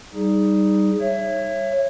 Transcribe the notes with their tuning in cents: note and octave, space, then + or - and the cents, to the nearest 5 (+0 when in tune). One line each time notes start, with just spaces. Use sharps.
G3 +0 D#4 +0 G#4 +0
C#5 -15 E5 +25